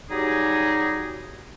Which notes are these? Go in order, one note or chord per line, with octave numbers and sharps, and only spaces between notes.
F#3 G3 D#4 G4 G#4